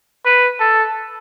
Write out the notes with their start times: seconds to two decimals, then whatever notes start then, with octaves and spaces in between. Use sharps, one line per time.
0.26 B4
0.60 A4